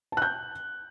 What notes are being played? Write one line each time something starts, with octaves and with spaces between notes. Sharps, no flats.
A5 F#6 G6